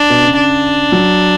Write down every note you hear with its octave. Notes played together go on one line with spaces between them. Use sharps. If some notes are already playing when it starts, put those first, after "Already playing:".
Already playing: D4
B2
C#3
C#3 D4
F#3